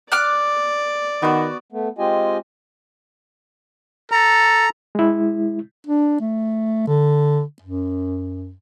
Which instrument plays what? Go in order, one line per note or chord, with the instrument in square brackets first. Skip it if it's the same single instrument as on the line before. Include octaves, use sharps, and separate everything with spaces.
[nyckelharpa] D5 [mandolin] D6 F6 F#6
[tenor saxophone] D#3 [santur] B3 F#4
[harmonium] A3 B3
G#3 C4 F4 G4 D#5 G#5
[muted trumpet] A4 [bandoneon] A#5
[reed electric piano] G#3 E4
[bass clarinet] D4
A3
D3
F#2